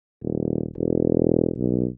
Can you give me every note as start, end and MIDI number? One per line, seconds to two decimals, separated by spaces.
0.22 0.67 27
0.77 1.51 28
1.57 1.86 35